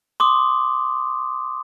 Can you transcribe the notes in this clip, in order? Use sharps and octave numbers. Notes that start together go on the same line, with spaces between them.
C6 D6 D#6